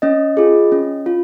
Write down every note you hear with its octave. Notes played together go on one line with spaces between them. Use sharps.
C#4 D#5
F4 G#4
C#4
F4